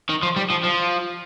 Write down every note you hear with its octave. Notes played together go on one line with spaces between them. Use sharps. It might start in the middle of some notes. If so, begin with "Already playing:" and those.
D#3
F3
G3
F3
F3